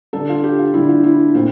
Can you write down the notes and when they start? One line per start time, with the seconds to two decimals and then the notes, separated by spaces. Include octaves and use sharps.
0.13 D3 G3 D4 A4
0.29 F4
0.44 G4
0.59 F4
0.74 D3 G3 D4 E4
0.89 F4
1.04 E4
1.35 A#2 A3 C4 F4